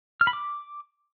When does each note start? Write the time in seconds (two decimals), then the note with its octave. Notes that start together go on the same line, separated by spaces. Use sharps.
0.21 F6
0.27 B5
0.33 D6